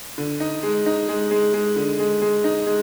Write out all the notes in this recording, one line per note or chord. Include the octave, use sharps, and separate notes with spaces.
D3
D#4
G#3
D#4
G#3
G#3
G#3
D3
G#3
G#3
D#4
G#3